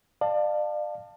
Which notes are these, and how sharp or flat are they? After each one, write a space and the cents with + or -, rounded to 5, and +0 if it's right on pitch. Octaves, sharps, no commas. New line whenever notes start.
D5 +35 F5 +0 A5 +10